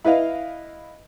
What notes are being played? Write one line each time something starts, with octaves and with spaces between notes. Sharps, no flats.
E4 B4 D#5 F5